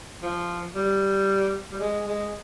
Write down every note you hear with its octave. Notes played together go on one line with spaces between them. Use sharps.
F3
G3
G3
G#3
G#3